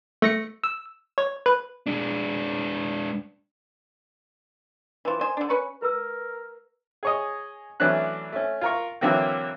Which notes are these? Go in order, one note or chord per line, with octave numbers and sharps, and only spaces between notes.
A3 A#6 C#7
E6
C#5
B4
G#3 D4
E3 F3
C5 D#5 G#5
D3 D4
C#4 B4 C#6
A#4 B4 A#5 E6
G#4 C#5 D#5
E3 F#3 A3 C#4 D4 F#6
A3 C#4
F4 A#4 C#6
D3 E3 F#3 A#3 C4